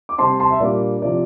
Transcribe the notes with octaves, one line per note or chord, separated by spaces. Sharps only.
D6
C3 G3 C4 A5 C6
A5 C6
E5
A#2 G3 A#3 D4 D5
C3 F3 D5